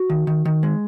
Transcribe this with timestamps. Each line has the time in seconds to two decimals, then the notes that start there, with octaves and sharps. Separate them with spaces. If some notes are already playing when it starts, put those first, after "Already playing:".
Already playing: F#4
0.10 D#3
0.27 D#3
0.45 D#3
0.63 G#3